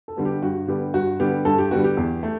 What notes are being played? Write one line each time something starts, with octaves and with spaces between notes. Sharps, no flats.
A4
D3 G3 B3
G4
G2 F#4
D3 G3 B3 G4
G2 F#4
D3 G3 B3 G4
G2 A4
G4
D3 G3 B3 F#4
G4
E2
A3